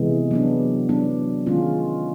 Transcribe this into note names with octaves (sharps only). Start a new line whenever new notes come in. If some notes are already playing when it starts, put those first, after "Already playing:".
Already playing: C3 E3 G#3 B3
F#3 B3 D4
F#3 B3 D4
D#3 G#3 C#4 F4